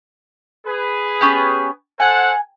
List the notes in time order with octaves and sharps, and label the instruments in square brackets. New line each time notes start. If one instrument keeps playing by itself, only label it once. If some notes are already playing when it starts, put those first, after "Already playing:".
[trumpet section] G#4 B4
[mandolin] B3 C#4 G4
[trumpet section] A4 C5 F#5 [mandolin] G#5